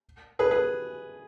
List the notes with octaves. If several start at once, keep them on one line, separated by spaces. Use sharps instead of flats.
G#4 B4
G#4 B4